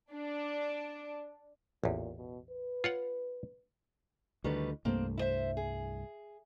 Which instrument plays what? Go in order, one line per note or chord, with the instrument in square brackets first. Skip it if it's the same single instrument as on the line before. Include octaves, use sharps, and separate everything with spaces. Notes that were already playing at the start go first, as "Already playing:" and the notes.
[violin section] D4
[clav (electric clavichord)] A1 E2 [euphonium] A#2
[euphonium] B2
B4
[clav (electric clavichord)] F4 C#5 F#5
[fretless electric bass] D2 D3 [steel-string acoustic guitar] D#3 G3 B4
[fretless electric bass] C2 G2 A3 [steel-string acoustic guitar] A#3 C4
[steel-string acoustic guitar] E4 C5 E5
G#4